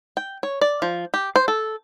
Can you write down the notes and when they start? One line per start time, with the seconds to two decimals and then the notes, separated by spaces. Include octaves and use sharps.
0.17 G5
0.43 C#5
0.61 D5
0.82 F3
1.14 G4
1.36 C5
1.48 A4